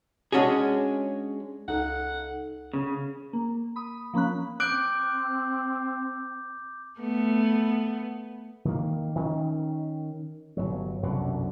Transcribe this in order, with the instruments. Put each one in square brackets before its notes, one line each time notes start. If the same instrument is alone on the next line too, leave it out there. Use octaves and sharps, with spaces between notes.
[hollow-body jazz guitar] G#3 C#4 D4 F#4 G#4
[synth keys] C#2 D#4 A4 [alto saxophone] F#5
[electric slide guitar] C#3
[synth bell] A#3
B5 D#6
F3 A#3 C#4 B5 F#6
[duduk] C4 [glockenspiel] D6 G6 [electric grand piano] F#6 D7
[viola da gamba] A3 B3
[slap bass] D#3 A#3
D#3 C#4
G1 C#2 F#3
C2 F#2 B2 D3